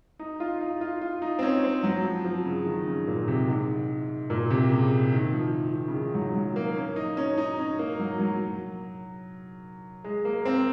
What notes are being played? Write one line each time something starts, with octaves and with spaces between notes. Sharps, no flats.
D#4
F4
D#4
F4
F4
D#4
C4
C#4
C4
F#3
F3
F3
C#3
D#3
C#3
A#2
C3
G#2
A#2
C3
C#3
D#3
F3
D#3
C#3
D#3
F#3
F#3
A#3
C#4
D#4
C#4
D#4
C#4
A#3
F#3
F#3
G#3
A#3
C4